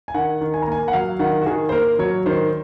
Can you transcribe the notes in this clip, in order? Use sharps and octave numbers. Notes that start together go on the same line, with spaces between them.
G#5
D#3 F#5
D#3
G#5
A#5
A#3 G#5
F#5
F#3 F5
D#3 F#5
F#4
D#3 G#4
C5
A#3 A#4
F#3 C#5
D#3 C5